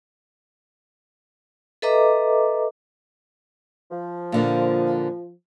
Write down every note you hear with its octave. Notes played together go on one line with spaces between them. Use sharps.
A4 B4 D#5 E5 A#5 D6
F3
A#2 D3 A#3